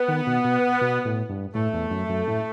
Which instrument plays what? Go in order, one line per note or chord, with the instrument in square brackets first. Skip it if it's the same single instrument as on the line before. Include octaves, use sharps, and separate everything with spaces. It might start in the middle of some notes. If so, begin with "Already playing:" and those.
Already playing: [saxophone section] B3
[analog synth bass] D#3
B2
B2
B2
A2
G2
[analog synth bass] A2 [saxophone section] A3
[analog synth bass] E2
F#2
F#2
A2